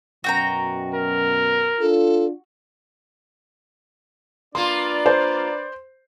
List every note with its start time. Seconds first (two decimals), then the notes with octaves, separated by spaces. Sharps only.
0.24 F#2 B2 F#4 G5 A#5
0.94 A#4
1.80 D4 F4 A4
4.55 A#3 D4 F4 B4 D5 C6
5.06 C5